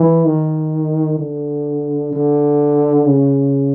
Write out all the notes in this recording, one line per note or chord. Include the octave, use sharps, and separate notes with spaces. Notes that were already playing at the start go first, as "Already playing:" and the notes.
Already playing: E3
D#3
D3
D3
C#3